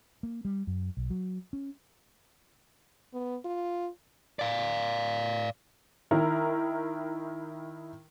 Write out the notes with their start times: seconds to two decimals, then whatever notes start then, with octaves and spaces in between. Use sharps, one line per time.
0.23 A#3
0.45 G3
0.67 F#2
0.97 B1
1.10 F#3
1.53 C#4
3.14 B3
3.45 F4
4.39 D5 F5
6.11 D#3 E4 A#4